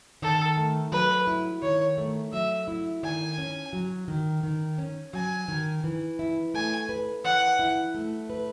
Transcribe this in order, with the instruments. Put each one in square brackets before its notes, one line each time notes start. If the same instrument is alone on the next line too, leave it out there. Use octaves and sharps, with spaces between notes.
[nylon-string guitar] D#3 [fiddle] A4
[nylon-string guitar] A3
[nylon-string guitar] F#3 [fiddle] B4
[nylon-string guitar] E4
[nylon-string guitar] D#3 [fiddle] C#5
[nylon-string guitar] A3
[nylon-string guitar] F#3 [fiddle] E5
[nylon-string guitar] E4
[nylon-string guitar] D#3 [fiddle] G#5
[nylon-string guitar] C#4
F#3
D#3
D#3
C#4
[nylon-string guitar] F#3 [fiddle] G#5
[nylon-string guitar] D#3
E3
E4
[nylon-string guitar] A3 [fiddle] G#5
[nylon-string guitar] B4
[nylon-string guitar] E3 [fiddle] F#5
[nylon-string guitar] E4
A3
B4